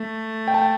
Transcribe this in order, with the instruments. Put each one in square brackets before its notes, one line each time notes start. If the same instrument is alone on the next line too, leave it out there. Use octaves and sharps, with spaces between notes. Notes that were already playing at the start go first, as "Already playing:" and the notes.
Already playing: [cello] A3
[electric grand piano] G5
A5
G5